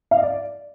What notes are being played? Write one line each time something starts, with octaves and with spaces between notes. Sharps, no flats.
F5
D#5
D5